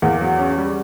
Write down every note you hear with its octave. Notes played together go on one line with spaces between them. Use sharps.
E2 A#3
F#3
C#4
G3